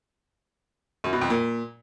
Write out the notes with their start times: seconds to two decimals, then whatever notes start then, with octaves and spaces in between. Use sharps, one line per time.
1.04 F#2
1.13 B2
1.21 F2
1.30 A#2